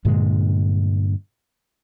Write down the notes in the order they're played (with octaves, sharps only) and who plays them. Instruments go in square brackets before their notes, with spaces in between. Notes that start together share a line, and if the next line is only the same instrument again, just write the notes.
[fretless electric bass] G2 A#2 D3 G#3